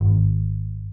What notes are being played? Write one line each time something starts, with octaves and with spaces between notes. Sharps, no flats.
G#1